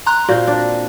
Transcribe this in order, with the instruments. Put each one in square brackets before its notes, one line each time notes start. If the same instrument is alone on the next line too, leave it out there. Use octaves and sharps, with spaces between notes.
[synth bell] A#5 C6 F#6
[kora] A#2 C4 [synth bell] F#4
[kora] D4